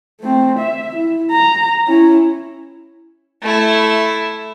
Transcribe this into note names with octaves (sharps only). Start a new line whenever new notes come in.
A3 C4
E5
E4
A#5
C#4 E4
A3 E4